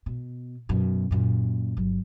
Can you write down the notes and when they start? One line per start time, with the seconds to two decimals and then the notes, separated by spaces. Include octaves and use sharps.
0.06 B2
0.69 F#2 B2
1.11 F#2 A#2
1.77 G1 F#3